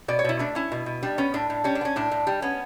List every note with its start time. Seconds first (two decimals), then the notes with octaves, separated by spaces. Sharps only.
0.08 B2 D5
0.19 C#5
0.24 B2 E4
0.39 A3 D4
0.55 C#4 E4
0.72 B2
0.86 B2
1.03 G3 D4
1.18 B3 C#4
1.34 A2 D4
1.50 A2
1.64 G3 C#4
1.75 D4
1.81 B3
1.85 C#4
1.96 A2 D4
2.11 A2
2.27 G3
2.42 B3 C#4